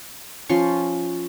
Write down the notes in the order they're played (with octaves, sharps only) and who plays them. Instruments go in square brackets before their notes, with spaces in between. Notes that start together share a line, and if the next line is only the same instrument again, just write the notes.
[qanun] F3 C#4 C6 C#6